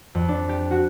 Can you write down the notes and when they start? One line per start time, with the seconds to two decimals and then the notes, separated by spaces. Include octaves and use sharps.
0.15 F2
0.28 D4
0.49 G4
0.71 F#4